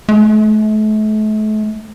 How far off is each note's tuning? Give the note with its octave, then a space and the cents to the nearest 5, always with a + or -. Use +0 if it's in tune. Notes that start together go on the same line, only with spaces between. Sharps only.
A3 -40